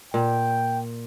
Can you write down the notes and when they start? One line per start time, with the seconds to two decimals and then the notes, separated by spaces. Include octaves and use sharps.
0.14 A#2 G5